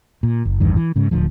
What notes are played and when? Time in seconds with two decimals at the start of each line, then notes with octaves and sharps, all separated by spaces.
0.23 A#2
0.45 F#1
0.60 A1 E2 G2 D#3
0.76 E3
0.96 G#2 C#3
1.11 D1 D2 F3